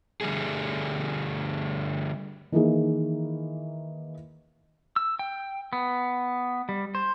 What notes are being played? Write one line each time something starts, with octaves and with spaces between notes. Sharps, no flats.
D3 G3 A3 G#4
D#3 E3 A#3 D#4 G#4
E6
G5
B3
G3
C5